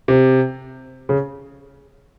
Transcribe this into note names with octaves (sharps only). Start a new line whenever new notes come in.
C3
C#3